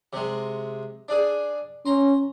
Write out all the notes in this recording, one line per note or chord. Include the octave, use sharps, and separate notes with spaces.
C3 G#3
D4 G#4
C#4 A#5 C6